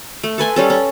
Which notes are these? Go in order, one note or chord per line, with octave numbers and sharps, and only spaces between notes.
A3
A4 B4 G#5 C6
G3 C#4 A4
C#4